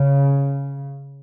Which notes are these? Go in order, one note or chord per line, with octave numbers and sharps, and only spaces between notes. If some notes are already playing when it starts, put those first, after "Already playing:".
Already playing: C#3